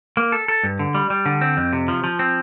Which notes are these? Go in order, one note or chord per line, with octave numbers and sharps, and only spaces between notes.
A#3
A4
A4
G2
D3
G3
G3
D3
C4
F2
C3
F3
F3
C4